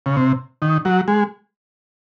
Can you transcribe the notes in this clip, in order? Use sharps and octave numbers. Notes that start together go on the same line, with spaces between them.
C#3
C3
D#3
F#3
G#3